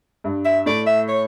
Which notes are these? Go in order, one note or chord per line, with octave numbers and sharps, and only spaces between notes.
G2
E5
A2 D5
E5
C#5